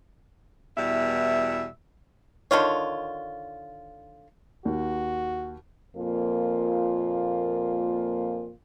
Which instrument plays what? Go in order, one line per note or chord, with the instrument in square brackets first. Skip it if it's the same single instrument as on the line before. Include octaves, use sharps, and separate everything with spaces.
[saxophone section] E2 B2 G3 E4 E5
[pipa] D3 D#3 F4 C#5
[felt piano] D#2 [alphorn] F#4
[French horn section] F2 A#2 A#3 F4